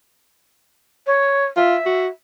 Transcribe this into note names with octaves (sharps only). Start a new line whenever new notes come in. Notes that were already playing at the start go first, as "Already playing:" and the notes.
C#5
F4 E5
F#4